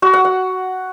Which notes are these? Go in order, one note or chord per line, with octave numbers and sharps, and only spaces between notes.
F#4
F#5
F#5